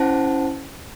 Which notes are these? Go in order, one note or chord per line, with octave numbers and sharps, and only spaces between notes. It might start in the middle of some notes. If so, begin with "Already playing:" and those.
Already playing: C#4 E4 C5 F#5 A5